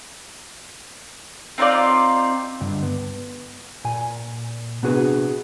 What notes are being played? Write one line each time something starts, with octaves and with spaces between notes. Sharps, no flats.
C4 D#4 F4 D5
C#2 G2 D3
B3
A#2 G#5
C3 B3 D4 F#4 G#4 B4